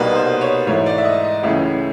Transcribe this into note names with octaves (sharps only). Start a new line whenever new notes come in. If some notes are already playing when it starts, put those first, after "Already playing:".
Already playing: C2 B2 G3 A#3 D#4 B4
C5
C#5
G#2 E3 A3 C#5
D5
E5
D#5
D#5
C#2 C#3 E3 A3 C#4 E5